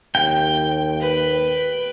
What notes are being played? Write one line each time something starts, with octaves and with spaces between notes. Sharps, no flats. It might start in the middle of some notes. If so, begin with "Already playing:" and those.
D#2 G5
B4